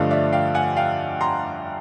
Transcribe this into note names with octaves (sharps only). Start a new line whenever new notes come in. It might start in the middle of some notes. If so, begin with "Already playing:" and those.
Already playing: G2 D3 F3 A3 D#5 F5
D5 E5
F5 G5
F#5 G#5
F5 G5
A#5 C6